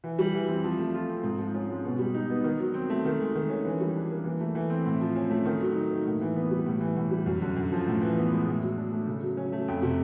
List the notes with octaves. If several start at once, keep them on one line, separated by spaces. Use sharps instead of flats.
E3
G3
E3
C4
F3
A3
F4
C4
G#2
F3
C#4
G#3
B2
G3
D#4
B3
D#3
F#3
C4
A3
D#3
G#3
D#3
C#4
E3
G3
D4
A#3
E3
A3
E3
C4
A2
F3
C#4
A3
D#3
F#3
D#4
A#3
A2
E3
B3
G3
A2
E3
A2
G3
F#2
D3
F#2
F3
A2
E3
B3
G#3
A2
F#3
D4
A3
C#3
F#3
C#4
A3
F2
C3